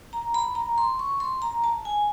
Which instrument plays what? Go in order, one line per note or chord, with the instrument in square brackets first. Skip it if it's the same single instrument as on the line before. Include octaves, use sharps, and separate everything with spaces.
[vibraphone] A#5
B5
A#5
C6
C#6
C6
A#5
A5
G#5